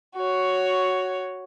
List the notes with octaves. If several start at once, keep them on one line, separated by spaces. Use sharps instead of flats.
F#4 C#5